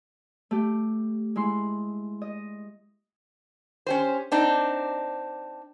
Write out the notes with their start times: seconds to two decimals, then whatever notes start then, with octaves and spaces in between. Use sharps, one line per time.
0.51 A3 G4
1.36 G#3 E4 C6
2.22 D#5
3.86 C#4 G4 C5
4.32 C4 D4 D#4